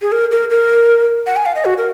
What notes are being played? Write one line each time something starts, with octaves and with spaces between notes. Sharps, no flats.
G#4
A#4
A#4
A#4
F#5
G#5
F5
D#5
F#4
A#4